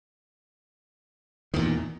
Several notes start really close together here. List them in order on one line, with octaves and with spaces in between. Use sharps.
D#3 E2 A#2